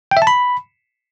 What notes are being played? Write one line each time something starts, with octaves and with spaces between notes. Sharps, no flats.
G5
E5
A5
B5